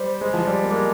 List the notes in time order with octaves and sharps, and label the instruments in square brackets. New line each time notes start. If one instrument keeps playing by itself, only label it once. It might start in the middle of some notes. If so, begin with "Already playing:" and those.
Already playing: [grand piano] G3 [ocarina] C5
[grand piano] G#3
F3
G3
A#3
[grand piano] G#3 [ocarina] A#4